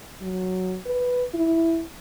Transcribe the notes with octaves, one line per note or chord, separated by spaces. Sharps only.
F#3
B4
E4